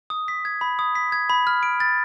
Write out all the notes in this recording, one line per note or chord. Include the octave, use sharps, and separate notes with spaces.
D#6
B6
G#6
B5
D#6
B6
G#6
B5
F6
D7
A6